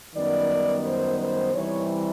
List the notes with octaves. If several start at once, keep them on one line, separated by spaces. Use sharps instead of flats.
F#2 D#3 G3 B3 D5
C5
C5
C3 E3 G3 C#5